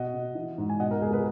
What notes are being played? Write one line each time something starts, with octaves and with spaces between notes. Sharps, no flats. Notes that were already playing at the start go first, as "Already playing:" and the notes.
Already playing: B2 D#5 F#5
B2
E3
G#2
G#5
B2 D#5 F#5
A#4
C#2 G#4
G#4 B4